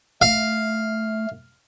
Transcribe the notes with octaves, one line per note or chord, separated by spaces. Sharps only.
A3 F5